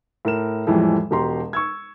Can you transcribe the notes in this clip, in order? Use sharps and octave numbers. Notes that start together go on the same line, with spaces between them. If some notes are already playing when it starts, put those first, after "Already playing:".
A2 A#4 E7
F2 A2 E3 F3 G3 G#3
E1 B2 G4 A#5 C6
C#6 E6 G#6